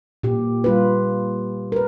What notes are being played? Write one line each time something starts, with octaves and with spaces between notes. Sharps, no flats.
A#2 G4
G3 F4 B4
A#4 B4